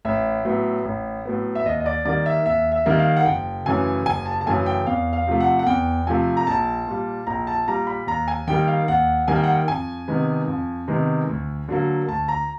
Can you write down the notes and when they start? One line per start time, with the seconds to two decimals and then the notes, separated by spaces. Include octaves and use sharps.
0.05 A1 E5
0.45 A2 F#3 B3
0.85 A1
1.26 A2 F#3 B3
1.55 E5
1.66 D#2 D#5
1.80 D#5
1.86 D5
2.05 D#3 G3 A#3 D5
2.26 E5
2.46 D#2 E5
2.72 E5
2.86 D#3 G3 A#3
2.99 F5
3.17 F#5
3.26 F#1 G5
3.66 F#2 C#3 E3 A3 G#5
4.06 F#1 G#5
4.26 A5
4.41 A5
4.46 F#2 C#3 E3 A3 G#5
4.66 G5
4.86 E2 F5
5.13 F5
5.27 C3 F3 A3
5.40 F#5
5.59 F#5
5.67 E2 G5
6.07 C3 F3 A3 G#5
6.37 A#5
6.47 A#1 A5
6.87 A#2 G3
7.27 A#1 A#5
7.47 A5
7.67 A#2 G3 A#5
7.87 B5
8.07 D#2 A#5
8.28 G#5
8.47 D#3 G3 A#3 G5
8.68 F5
8.88 D#2 F#5
9.28 D#3 G3 A#3 G#5
9.36 G5
9.44 F#5
9.52 G5
9.68 F2 G#5
10.08 C3 D#3 G#3 B3
10.48 F2
10.88 C3 D#3 G#3 B3
11.29 D2
11.68 D3 F#3 A#3
12.08 D2 A5
12.28 A#5